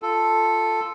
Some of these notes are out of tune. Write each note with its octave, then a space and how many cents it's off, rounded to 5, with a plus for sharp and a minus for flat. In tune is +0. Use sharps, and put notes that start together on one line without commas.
F4 -10 A4 +0